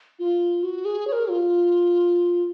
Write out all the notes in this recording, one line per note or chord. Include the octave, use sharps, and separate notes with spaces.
F4
F#4
G#4
C#5
A#4
F4